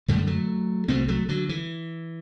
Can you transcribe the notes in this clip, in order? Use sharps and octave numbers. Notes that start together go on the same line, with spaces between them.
F#2 D3 A3
G3
F#3 A3
C2 B2 A3 C4
F#3 A3
D3 F#3
E3